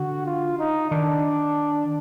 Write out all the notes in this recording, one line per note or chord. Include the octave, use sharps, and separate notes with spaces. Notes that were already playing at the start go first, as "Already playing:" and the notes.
Already playing: D3 F#4
F4
D#4
D#3 D4